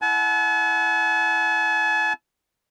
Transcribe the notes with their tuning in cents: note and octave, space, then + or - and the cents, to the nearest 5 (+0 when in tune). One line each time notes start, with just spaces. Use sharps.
E4 +0 F#5 +0 A5 -45